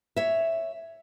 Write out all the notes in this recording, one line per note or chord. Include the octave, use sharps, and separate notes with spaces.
C#5 E5